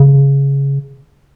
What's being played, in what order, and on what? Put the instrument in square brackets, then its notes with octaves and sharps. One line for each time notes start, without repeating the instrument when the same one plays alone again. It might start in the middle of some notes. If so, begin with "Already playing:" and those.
Already playing: [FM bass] C#3